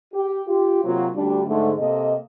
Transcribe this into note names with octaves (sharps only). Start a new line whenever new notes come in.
G4
F4 G4
C3 F#3 A#3 F4 F#4 C5
D2 G3 D4
G#2 D3 A3
C3 A#3 A4 D#5